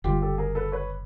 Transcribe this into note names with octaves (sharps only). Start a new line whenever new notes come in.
F#1 F#2 D3 G3 F4 G4
G4 A4
G#4 A#4
A4 B4
B4 C#5